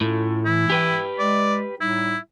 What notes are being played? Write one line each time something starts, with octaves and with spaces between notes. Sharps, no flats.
A2 C#4 F4 A4
E3 E4
G4 B4 G5
G#3 D5
A2 G3 D#4 E4